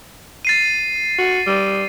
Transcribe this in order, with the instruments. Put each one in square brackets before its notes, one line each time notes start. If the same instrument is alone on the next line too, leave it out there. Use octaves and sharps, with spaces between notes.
[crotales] A6 C7 D#7
[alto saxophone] F#4
G3